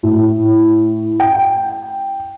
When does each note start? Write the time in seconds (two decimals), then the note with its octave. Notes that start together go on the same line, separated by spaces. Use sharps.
0.03 A2
1.20 G5